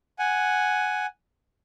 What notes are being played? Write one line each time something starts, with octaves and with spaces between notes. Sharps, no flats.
F#5 G#5